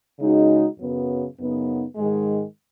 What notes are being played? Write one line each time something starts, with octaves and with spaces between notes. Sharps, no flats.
C#3 G#3 D#4 F#4
F#2 C#3 F#3 B3
F#2 C#3 B3 D#4
G#2 D#3 G#3